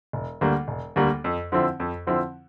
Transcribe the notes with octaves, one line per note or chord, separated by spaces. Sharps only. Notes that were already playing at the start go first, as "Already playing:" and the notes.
E1
D2 D3 G3 A#3
E1
D2 D3 G3 A#3
F2
D3 F3 C4 E4
F2
D3 F3 C4 E4